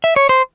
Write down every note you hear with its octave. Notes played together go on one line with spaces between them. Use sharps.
E5
C#5
C5